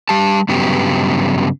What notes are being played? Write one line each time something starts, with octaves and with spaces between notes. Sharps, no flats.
G3 G4 A5
G2 C#3 F#3 B3 G4